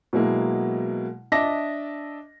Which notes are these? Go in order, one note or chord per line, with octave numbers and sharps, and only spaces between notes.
B2 F#3 G#3 A#3 E4
D4 D#5 E5 A5 D6 A#6